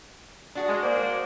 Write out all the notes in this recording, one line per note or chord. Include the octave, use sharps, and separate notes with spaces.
D4 F#4 G#4
G#3
A#3 C5 D5
F#4